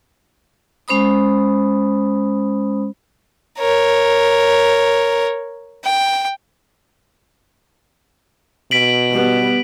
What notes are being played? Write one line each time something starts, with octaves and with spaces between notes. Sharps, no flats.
G#3 C#4 C5 B5 D#6
A#4 C#5
G5
B2 B6 D7 F#7
G3 B3